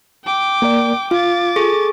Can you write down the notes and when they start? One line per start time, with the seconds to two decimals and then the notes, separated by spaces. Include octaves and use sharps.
0.25 G5 D6
0.62 A#3 A#4 D5
1.11 F4 F5 D6 A6
1.56 G#4 A4 C#6